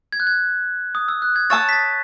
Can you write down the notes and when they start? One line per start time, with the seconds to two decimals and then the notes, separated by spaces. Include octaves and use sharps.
0.12 G#6
0.20 F#6
0.27 G#6
0.95 D#6
1.08 E6
1.22 F#6
1.36 G#6
1.50 C#5 E5 A5 D#6 A6
1.69 B6
1.73 A6